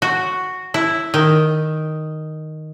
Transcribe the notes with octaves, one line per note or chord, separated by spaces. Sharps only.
F#4
E4
D#3